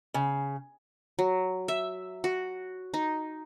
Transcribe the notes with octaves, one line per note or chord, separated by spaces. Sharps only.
C#3
F#3
E5
F#4
D#4